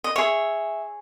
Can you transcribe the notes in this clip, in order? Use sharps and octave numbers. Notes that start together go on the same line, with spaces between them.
D#5
G#4 C#5 E5